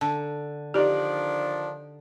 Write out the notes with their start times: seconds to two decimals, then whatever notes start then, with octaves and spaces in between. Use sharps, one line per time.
0.01 D3 A5
0.74 D#3 F3 D4 D#4 G4 D5